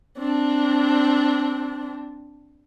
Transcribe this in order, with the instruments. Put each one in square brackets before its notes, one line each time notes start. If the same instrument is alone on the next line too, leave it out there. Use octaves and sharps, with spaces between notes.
[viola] C4 D4